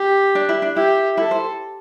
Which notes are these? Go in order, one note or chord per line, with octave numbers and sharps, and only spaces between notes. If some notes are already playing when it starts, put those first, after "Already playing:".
Already playing: G4
D4
E4
D4
E4 G4
E4 A4
C5